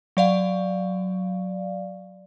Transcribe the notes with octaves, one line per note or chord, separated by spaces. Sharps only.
F#3 D5 F5